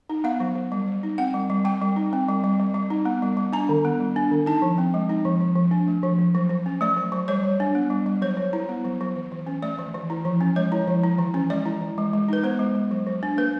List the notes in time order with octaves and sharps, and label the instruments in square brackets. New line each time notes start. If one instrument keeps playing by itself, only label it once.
[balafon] D#4
B3 F5
F#3
F#3
G3
G3
D#4
C4 F#5
G3
G3
G3 G5
G3
D#4
C4
G3
G3
G3
G3
D#4
B3
G3
G3
D4 A#5
D#3
B3
G3
D4
D#3
D#4 A5
F3
C4
G#3
D#4
F3
F3
F3
D4
A3
F3
F3
F#3
F#3
C#4
A3 D5
F#3
F#3
G3 C#5
G3
D4
B3
G3
G3
F#3 C#5
F#3
E4
B3
F#3
F#3
E3
E3
C#4
A3 D5
E3
E3
E4
F3
C#4
G#3 C#5
E4
F3
E4
E3
C#4
G#3 D5
E4
E3
G#3
G#3
D#4 B4
B3 C5
G#3
G#3
F#3
F#3
D4
A#3 B4